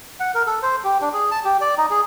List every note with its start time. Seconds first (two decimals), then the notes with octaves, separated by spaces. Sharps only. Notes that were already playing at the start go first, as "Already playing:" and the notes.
0.20 F#5
0.35 A#4
0.47 A4
0.62 C5
0.84 G4
1.01 D4
1.13 G#4
1.31 A5
1.45 G4
1.61 D5
1.78 D#4
1.90 G#4